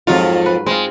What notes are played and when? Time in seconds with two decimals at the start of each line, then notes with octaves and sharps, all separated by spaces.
0.07 F2 G#2 F#3 F4
0.46 B4
0.66 G#3 C4 F4